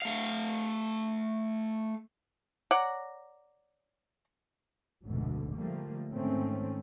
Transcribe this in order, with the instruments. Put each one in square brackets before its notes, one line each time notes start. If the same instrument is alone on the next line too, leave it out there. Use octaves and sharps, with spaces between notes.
[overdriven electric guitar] A3 F5
[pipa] C#5 D5 F#5 A#5
[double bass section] F1 D2 G#2 B2 D3
D3 F3 G3 A3 A#3
G#2 D#3 A3 C4 C#4